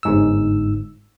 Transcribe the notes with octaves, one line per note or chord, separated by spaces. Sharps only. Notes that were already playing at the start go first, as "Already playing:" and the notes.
G1 G#2 E6